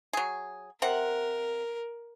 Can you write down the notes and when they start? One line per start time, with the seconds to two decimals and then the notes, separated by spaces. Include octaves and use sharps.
0.13 F#3 G#4
0.82 C3 C4 A#4 F#5